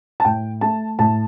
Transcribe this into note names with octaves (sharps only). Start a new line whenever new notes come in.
A5
A2 G5
A3 A5
A2 A5